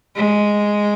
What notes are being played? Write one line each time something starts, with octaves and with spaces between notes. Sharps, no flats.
G#3